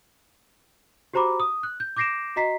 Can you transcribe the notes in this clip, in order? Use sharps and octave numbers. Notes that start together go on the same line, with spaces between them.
F#4 G4 C5 A#5 B5 D6
D#6
F#6
G6
D6 G6 A#6 C7 D7 E7
F#4 D#5 A#5 B6 C7